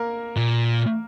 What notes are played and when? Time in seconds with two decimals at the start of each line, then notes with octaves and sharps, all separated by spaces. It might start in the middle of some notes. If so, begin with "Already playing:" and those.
Already playing: A#3 A#4
0.36 A#2